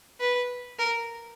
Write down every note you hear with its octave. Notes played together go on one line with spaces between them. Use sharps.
B4
A#4